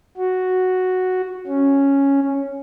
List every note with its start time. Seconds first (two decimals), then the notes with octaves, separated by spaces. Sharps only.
0.17 F#4
1.47 C#4